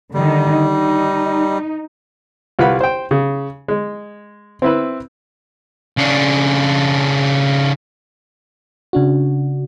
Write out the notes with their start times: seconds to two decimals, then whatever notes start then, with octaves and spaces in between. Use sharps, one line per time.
0.14 D3 D#3 G3 D#4
0.70 D#4
2.59 C2 F4 B4 F#5 B5
2.81 C5 G5
3.11 C#3
3.68 G#3
4.62 C4 E4 B4
5.97 C#3 D4
8.93 C#3 D4 F#4